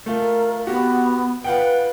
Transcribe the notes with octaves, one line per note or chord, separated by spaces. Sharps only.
A3 F4 A#4
B3 F#4 G4
F4 B4 F#5 G5